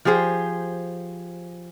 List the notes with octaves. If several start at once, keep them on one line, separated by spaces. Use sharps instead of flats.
F3 G4 G#4 C5